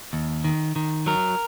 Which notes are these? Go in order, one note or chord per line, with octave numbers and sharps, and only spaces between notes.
D#2
D#3
D#3
F#3 A#4